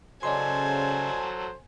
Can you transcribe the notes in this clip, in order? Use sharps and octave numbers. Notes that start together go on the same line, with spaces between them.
C#3 F#3 A4 C5 D5 D#5 G#5 C6